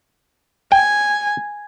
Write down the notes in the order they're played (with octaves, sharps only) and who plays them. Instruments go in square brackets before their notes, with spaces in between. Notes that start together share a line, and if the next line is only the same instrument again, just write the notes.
[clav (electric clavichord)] G5 [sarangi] G#5